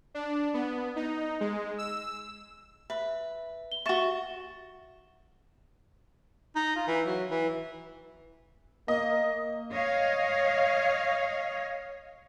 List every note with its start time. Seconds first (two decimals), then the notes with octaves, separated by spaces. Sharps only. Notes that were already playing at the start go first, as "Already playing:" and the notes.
0.15 D4
0.54 B3
0.96 D#4
1.41 G#3
1.78 E6
2.90 B4 E5
3.72 G7
3.86 F#4 E5 C#6 A6 E7
6.55 D#4
6.76 F4
6.88 E3
7.06 F#3
7.30 E3
8.88 A#3 D#5
9.74 C#5 D#5 F5